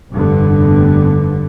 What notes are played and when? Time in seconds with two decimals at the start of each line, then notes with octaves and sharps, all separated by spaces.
0.12 F1 G2 D3 B3